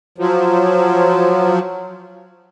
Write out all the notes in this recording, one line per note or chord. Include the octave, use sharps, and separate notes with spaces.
F3 F#3